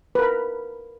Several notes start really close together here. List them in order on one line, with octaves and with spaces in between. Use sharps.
B4 A#4 B5